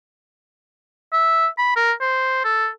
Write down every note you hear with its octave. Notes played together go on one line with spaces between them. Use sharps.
E5
B5
A#4
C5
A4